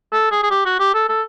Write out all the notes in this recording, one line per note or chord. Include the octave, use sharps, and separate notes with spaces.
A4
G#4
G#4
G4
F#4
G4
A4
A4